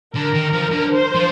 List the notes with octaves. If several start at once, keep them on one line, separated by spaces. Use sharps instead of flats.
D3 A#4
D#3
F3
D3
C5
F3